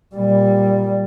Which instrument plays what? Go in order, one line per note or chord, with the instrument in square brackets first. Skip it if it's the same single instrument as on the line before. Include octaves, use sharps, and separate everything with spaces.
[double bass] A#2 G3